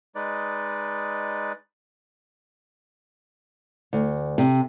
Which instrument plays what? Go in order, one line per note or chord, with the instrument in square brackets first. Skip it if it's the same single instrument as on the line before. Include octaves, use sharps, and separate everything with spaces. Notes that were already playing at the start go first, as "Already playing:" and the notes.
[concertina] G#3 D#4 B4 D5
[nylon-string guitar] D2
C3